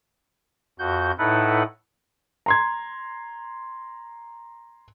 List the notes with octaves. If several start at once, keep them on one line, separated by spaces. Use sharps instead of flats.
F2 F#4 G6
A2 D#4 E4 A4 B4 F#5
A#5 C6 G#6